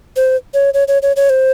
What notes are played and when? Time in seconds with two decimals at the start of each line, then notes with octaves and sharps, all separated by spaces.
0.16 C5
0.54 C#5
0.74 C#5
0.88 C#5
1.02 C#5
1.16 C#5
1.30 C5